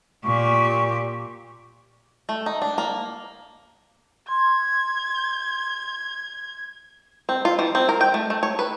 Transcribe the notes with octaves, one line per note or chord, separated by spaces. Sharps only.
A#2 G4 C#6
A3
D#4
D4
A#3
C6 G#6
C4
F4
E3
C4
A#4
G5
A3
A3
C#5
B4